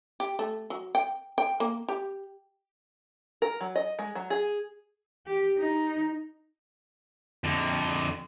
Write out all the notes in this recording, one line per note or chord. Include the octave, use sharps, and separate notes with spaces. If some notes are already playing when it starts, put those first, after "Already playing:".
G4
A3
F#3
G5
G5
A#3
G4
A#4
F#3
D#5
G#3
F#3
G#4
G4
D#4
F2 D3